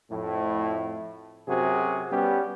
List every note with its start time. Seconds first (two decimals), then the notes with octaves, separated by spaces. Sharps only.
0.11 F2 A2
1.48 F#2 C3 F#4 G#4
2.11 G3 B3 C#4 G4